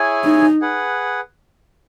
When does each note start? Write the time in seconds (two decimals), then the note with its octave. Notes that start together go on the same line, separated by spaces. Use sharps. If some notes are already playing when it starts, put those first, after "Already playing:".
Already playing: E4 G#4 C#5 G#5
0.25 D#4
0.61 G#4 B4 F#5